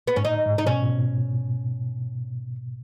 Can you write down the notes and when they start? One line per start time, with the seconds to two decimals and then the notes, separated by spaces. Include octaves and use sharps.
0.07 B3
0.16 G#2 C#4
0.25 A2 D#4
0.46 G#2
0.58 D#4
0.67 B2 C#4
0.88 B2